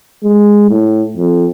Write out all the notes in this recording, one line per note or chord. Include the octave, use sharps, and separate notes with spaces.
G#3
A2
F2